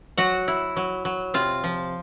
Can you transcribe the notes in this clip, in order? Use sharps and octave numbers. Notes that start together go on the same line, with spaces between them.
F#3 F#4 F#5
E4
F#3
F#3
C3 F4 F5
F3